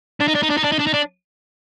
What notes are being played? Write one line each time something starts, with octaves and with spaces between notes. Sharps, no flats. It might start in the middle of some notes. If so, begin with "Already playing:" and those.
D4
D#4
D4
D#4
D4
D#4
D4
D#4
D4
D#4
D4